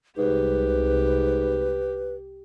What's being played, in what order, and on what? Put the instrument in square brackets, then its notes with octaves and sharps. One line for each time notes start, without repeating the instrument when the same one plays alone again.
[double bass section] C2 [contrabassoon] G#2 [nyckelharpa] G4 [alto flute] B4